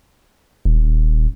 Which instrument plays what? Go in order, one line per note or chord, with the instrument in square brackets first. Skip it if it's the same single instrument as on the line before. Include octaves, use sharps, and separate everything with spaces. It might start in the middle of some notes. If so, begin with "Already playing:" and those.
[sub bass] D#1